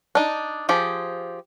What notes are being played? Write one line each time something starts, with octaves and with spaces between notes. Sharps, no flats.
D4 D#4
F3 G4 G#4